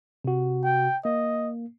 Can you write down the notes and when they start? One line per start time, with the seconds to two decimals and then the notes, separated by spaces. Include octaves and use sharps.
0.24 C3 F#4
0.64 G5
1.05 A#3 D#5